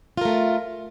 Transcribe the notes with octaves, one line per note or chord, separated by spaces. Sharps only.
A3 F4 A#4